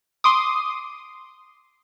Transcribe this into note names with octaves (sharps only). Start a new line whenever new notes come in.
C6 D6 D#6